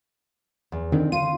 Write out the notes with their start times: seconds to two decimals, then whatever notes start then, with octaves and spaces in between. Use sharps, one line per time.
0.72 E2
0.92 D3 D#3 C4
1.12 F4 D#7